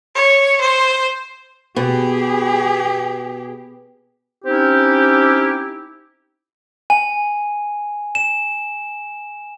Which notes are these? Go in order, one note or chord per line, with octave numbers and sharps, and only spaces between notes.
C#5
C5
B2 G4 G#4
C4 C#4 D#4 E4 G4
G#5
E7